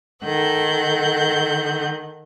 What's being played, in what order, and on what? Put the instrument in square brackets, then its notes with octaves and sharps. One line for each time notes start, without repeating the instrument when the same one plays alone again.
[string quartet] D#3 A4 F#5 G6